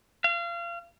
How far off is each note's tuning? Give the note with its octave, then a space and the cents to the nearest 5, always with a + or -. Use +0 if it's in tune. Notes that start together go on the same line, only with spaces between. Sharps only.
F5 -30